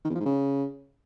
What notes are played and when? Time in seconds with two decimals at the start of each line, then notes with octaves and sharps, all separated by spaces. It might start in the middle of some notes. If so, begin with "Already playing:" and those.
0.05 D#3
0.10 E2
0.15 F3
0.20 G#2
0.26 C#3